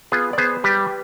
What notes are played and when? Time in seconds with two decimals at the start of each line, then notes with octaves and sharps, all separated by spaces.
0.12 B3 F4 G#4
0.33 D5
0.38 B3 G#4 C5
0.64 G3 G4 B4